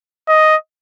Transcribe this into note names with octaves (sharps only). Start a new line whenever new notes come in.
D#5